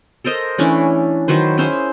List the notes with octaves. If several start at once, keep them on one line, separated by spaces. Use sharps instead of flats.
A4 A#4 C5 D#5
E3 A3 C#4 D4
D#3 F#3 B4 C5
C#4 E4 G#4 C5